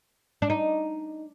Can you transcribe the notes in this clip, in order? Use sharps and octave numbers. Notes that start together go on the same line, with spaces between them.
D4
D#4